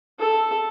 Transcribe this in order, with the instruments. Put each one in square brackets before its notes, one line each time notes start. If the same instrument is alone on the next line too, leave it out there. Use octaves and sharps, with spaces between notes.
[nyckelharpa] A4